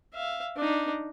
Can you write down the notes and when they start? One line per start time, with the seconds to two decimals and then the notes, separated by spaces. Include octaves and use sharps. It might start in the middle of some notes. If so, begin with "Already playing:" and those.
0.14 E5 F5
0.56 D4 D#4